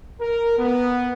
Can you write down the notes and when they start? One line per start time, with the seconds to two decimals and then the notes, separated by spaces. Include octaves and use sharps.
0.21 A#4
0.58 B3